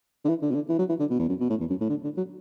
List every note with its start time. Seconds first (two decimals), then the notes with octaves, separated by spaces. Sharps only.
0.24 D3
0.29 E3
0.42 D3
0.50 B2
0.55 D3
0.69 E3
0.78 F#3
0.89 E3
0.99 D3
1.10 B2
1.19 E2
1.29 F#2
1.40 B2
1.49 A2
1.60 E2
1.69 F#2
1.80 A2
1.89 D3
2.04 D3
2.17 F#3